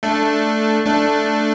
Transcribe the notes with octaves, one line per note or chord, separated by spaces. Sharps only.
A3 D4
A3 D4